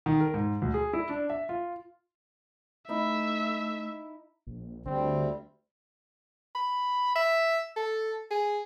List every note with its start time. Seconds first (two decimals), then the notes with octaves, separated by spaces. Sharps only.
0.06 D#3
0.20 A#4
0.34 G#2
0.62 D2
0.74 G#4
0.93 E4
1.09 D4
1.30 E5
1.49 F4
2.89 A3 D#4 E4 E5
4.47 A#1
4.86 D2 D3 G3 C4
6.55 B5
7.15 E5
7.76 A4
8.31 G#4